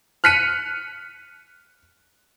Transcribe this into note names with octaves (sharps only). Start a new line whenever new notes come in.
F6 F#6 B6 C#7 D#7